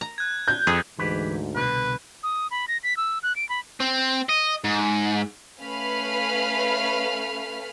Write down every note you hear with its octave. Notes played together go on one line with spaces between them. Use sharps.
A#5
F#6 G#6
G6
F2 G#4
D2 G#2 E3 G4 B4
C2 B2 D3 B4
D#6
B5
A#6
B6
E6
F#6
D7
B5
C4
D#5
G#2
A3 C#4 B4 F5 B5 F6